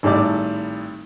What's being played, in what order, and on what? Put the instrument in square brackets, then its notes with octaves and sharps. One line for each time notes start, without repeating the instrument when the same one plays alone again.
[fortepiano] G#1 A2 G3 D#4 D5 D6